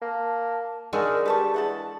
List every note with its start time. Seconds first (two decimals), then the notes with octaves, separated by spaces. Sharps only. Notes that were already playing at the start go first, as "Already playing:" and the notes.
0.01 A#3 A5
0.93 D#3 G#3 D4 F#4 G#4 A#4 E5
1.26 G3 B4 A5 C#6
1.54 E3 G#4 A4 F#5 A5